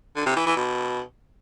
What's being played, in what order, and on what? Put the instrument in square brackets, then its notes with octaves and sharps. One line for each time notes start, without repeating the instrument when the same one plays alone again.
[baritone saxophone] D3
C3
E3
E3
B2